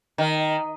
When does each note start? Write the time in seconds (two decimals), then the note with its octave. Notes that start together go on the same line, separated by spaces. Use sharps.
0.18 D#3